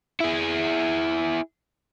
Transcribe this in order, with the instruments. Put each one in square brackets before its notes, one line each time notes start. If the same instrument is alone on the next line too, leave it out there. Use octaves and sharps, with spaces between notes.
[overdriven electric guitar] E4 G#4